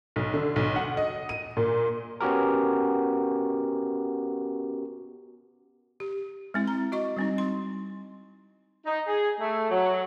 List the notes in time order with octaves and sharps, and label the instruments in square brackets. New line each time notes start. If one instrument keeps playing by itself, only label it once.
[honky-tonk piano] B1
D3
B1
F#5
D#5
D#7
A#2
[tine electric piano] B3 C#4 F#4 G4 A#4
[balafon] G4
G#3 C4 E4
A#5
F#4 D#5 C#6
G3 C4 D#4
C6
[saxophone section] D#4
G#4
A3
F#3